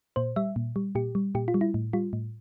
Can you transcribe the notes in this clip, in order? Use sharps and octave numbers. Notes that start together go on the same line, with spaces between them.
A#2 C5
G3 E5
A#2
G3
A#2 G4
G3
A#2 G4
F4
G3
E4
A2
G3 F4
A2